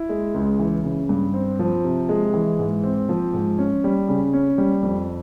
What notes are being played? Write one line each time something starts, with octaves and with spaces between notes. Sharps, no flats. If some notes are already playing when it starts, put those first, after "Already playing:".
Already playing: E4
G#3
C#2
E3
C#3
G2
C4
F3
C3
G#3
E3
G#2
C4
F3
G#2
C#4
G3
C#3
C#4
G3
F2